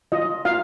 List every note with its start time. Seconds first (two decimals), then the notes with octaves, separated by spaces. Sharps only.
0.12 F4 D#5
0.45 F4 F5